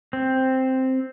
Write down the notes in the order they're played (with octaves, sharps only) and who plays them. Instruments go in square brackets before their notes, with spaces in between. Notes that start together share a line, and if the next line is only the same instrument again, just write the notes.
[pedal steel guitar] C4